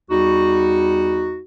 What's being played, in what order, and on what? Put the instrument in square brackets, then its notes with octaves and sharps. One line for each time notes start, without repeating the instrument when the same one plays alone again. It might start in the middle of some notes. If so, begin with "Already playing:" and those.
[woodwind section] E2 G3 D#4 F#4